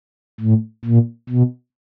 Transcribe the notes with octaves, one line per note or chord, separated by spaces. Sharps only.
A2
A#2
B2